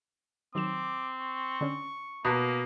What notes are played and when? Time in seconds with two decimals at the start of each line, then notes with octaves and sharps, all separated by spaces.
0.55 D#3 F#3 C4 D6 E7
1.20 C#6
1.61 D3 C#4
2.25 B2 A#3 A5 A#5 F#6